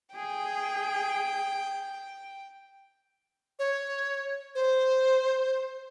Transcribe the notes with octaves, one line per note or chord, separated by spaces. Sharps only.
G#4 G5
C#5
C5